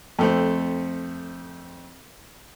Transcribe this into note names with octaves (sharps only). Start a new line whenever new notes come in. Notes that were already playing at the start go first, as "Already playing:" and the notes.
F2 A3 C4